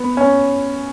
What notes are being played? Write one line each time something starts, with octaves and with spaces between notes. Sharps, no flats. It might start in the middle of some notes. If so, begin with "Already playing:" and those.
Already playing: B3
C#4